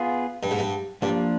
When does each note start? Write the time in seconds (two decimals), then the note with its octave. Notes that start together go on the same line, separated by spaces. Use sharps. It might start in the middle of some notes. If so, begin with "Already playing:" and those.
Already playing: B3 F4 G#4
0.43 G2
0.51 G#2
0.59 G2
1.02 G2 F3 A#3 D4